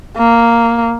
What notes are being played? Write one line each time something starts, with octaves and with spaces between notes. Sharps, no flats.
A#3